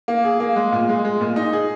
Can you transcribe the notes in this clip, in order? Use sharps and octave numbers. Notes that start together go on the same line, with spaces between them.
A#3
G#4
A#3
G#3
A#2
G#3
G#3
A#2
D#4
G#4